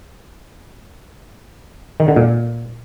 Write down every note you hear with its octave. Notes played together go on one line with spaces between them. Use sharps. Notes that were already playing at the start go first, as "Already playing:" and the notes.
D#3
D3
A#2